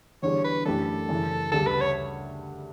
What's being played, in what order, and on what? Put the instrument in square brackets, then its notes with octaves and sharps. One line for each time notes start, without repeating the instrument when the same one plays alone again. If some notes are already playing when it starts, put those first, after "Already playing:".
[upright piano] E2 D3 G3 [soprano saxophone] C#5
[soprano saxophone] B4
[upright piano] F#2 E3 A3 D4 G4 [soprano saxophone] A4
[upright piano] F#2 C#3 E3
[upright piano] D2 C#3 G3 [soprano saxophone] A4
[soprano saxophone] B4
C#5